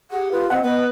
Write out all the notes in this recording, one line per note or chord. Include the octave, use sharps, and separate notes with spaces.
G4 G#4 F#5
F4 B4
C4 D#5 F#5
B3 B4 D#5